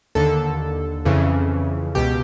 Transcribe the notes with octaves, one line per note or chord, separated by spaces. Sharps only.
D#2 D3 A4
F2 C#3 E3
C#2 B2 G4